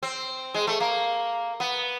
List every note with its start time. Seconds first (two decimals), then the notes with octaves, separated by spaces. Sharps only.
0.03 C4
0.54 G#3
0.67 A3
0.80 A#3
1.60 B3